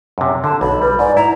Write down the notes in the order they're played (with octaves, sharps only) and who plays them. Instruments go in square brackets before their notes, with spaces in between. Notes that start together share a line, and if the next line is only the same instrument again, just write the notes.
[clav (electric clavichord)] F#2 C3
[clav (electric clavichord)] D3 [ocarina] A5
[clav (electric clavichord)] B1 [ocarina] B5
[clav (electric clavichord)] G3 [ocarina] B4
[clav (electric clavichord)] G#2 [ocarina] D5
[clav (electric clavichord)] E4 [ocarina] A#5